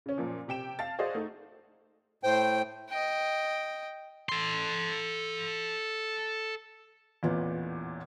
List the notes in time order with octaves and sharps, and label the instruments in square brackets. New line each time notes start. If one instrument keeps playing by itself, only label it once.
[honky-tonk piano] C#3 C#4
F#2 A#2 F3
C3 G4 G5 E7
F5 A5 A6
F#4 G#4 C5 D5 D#5 F5
A3 D#4
[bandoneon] A2 G5 [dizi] C5
[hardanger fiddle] D#5 G5
[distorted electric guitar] A4 C6
[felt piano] A1 E2 A#2 B3